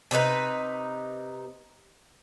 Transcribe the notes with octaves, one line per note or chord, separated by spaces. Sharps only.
C3 D4 D#4 B4